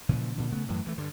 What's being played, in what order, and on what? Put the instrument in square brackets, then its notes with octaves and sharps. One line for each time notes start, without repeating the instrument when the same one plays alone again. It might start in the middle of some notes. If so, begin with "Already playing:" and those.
[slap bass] A#2 C#3 E3 F3
A#2 D3 F3
C#3 A3 B3
F#2 A2 E3 F#3
G2 E3 A3
G2 D3